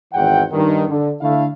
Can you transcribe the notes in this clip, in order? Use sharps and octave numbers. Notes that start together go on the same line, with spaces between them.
G#1 E2 E3 F#5 G5
G2 D#3
D3
D3 A3 E4 F5